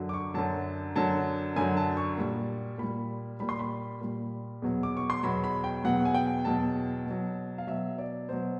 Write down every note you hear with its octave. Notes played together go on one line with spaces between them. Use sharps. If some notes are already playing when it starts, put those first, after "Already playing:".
Already playing: F#2 D3 F#3
D6
C#6
F#2 D3 F#3 A5
F#2 D3 F#3 A5
F#2 D3 F#3 G#5
A5
C#6
A#2 G3
A#2 G3 B5
A#2 G3 B5
C6
B5
A#2 G3
E2 B2 F#3
D6
C#6
C6
E2 B2 F#3 B5
B5
G5
E2 B2 F#3 F#5
G#5
G5
E2 B2 F#3 A5
B2 F#3
F5
B2 F#3 E5
D5
B2 F#3 C5